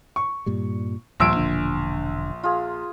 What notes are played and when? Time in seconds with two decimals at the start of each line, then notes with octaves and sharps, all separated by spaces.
0.16 C#6
0.46 G2 A#2 G3
1.20 A#1 D#2 A#2 G3 C5 G#5 E6 D7
1.36 E1 D3 D4
2.43 F4 G#4